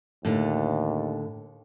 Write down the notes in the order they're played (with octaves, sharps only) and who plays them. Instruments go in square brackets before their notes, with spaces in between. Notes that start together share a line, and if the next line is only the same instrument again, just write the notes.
[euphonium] D#2 [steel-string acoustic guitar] A2 D3